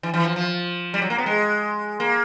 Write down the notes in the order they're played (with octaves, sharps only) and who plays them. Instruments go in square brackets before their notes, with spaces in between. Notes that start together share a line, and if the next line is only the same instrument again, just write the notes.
[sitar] E3
E3
F3
F3
G3
F#3
A#3
B3
G#3
A#3